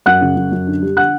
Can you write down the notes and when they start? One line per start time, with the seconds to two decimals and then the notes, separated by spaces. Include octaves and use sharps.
0.06 F#2 F#5 F#6
0.21 C#3
0.36 F#2
0.52 F#2
0.67 D3
0.82 G3
0.97 D3 F#5 F#6